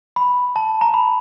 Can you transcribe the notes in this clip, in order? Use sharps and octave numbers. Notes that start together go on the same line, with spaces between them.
B5
A5
A#5
B5